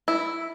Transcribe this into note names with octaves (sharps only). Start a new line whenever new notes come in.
E4